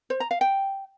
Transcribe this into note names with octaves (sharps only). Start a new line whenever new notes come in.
C5
A#5
F5
G5